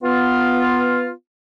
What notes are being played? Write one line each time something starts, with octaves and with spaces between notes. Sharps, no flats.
B3 F4